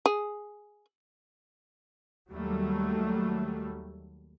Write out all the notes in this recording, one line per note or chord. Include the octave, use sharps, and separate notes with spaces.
G#4
D#2 F#3 G3 A3